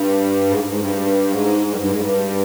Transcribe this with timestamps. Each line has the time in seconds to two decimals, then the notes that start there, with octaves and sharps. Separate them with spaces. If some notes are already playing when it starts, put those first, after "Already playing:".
Already playing: G2
0.49 G#2
0.70 G#2
0.80 G2
1.30 G#2
1.71 G2
1.81 G2
1.91 G#2
2.01 G2